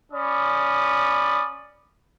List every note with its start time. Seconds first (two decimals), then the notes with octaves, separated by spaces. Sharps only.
0.12 C#4 D5 B5 D#6